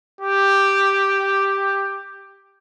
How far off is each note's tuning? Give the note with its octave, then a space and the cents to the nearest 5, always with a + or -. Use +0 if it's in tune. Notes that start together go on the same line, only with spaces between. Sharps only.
G4 +5